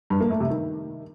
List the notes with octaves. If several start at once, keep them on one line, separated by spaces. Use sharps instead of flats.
G2
A#3
A3
C3
D#3